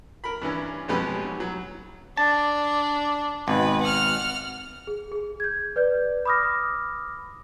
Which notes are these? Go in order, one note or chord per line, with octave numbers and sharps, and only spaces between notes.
A#4 B5
G2 E3 C#4
F2 B2 G#3 C#4 G4 B4
B1
F#3
D4 A5
G#1 B2 B4
F#5 F6
G#4
G#4
G6 G#6
B4 D5 G6
B5 D6 D#6 F6 A#6